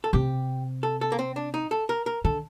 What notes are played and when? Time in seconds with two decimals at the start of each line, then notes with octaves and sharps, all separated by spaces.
0.04 A4
0.13 C3 G4
0.83 A4
1.01 A4
1.12 A#3
1.19 C4
1.36 D4
1.54 D#4
1.71 A4
1.89 A#4
2.06 A#4
2.24 D3 A4